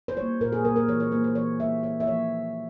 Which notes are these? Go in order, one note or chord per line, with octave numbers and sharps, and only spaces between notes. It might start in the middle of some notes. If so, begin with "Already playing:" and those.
C5
G3 A#3 C#5
A#2 A#4
G#4
G3 A#3 A#4
A#4
E3 C#5
C#5
G3 A#3 C5
C5
E3 C#5
G3 A#3 E5
A#2 C#5
E5
F3 A#3 C#5